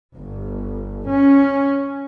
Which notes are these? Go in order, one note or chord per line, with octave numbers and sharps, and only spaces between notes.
G1
C#4